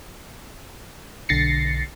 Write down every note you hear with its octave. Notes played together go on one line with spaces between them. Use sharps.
B1 D3 A6 A#6 C7 C#7